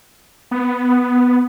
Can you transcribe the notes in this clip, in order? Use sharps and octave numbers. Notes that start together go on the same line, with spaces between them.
B3